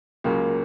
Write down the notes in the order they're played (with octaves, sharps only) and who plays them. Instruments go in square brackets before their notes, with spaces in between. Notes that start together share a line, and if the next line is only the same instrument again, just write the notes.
[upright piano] C#2 C#3 F#3 A#3